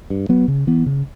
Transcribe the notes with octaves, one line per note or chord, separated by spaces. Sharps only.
G2
F#3 B3
C#3
E3 B3
C#3